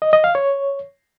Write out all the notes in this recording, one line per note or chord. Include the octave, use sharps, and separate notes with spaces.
D#5
D#5
F5
C#5